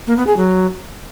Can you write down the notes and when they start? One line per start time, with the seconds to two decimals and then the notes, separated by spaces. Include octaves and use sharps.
0.07 A#3
0.17 B3
0.27 G#4
0.37 F#3